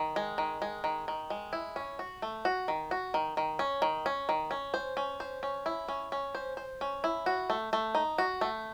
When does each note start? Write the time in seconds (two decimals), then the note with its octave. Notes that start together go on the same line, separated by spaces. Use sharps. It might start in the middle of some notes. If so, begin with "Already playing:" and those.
Already playing: D#3
0.16 G#3
0.38 D#3
0.62 G#3
0.84 D#3
1.08 D#3
1.30 G#3
1.53 E4
1.76 C#4
1.99 F#4
2.22 A3
2.45 F#4
2.68 D#3
2.91 F#4
3.14 D#3
3.37 D#3
3.59 C#4
3.82 D#3
4.06 C#4
4.29 D#3
4.51 C#4
4.74 C5
4.97 C#4
5.20 C5
5.43 C#4
5.66 E4
5.88 C#4
6.12 C#4
6.35 C5
6.57 C5
6.81 C#4
7.04 E4
7.26 F#4
7.50 A3
7.73 A3
7.95 D#4
8.18 F#4
8.41 A3